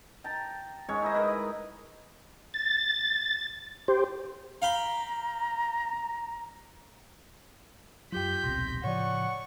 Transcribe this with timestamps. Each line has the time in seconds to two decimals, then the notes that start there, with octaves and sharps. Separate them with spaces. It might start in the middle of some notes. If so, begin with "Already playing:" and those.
0.24 G5 A5 A#5
0.89 G#2 G#3 C#4 C#5
1.02 D#4 E4 C5 D#5
1.15 A#4 B4
1.28 D#5
2.54 A6
3.88 G4 C5
4.62 F5 G5 A#5 B5
8.12 F#2 F#3 F4 G4 G5 G6 B6
8.44 D#1 B1 C3 C6 A#6
8.84 A2 C#3 F3 C#5 D5 F#5 C#6